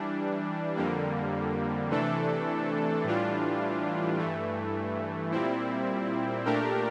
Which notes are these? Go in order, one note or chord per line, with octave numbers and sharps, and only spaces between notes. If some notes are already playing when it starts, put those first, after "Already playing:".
Already playing: E3 G3 D4
F2 D3 G3 A#3
C3 E3 A3 D4 A4
A2 E3 G3 D4 F4
G2 E3 A3
A#2 G3 C4 E4
A#2 A3 D4 G4 A#4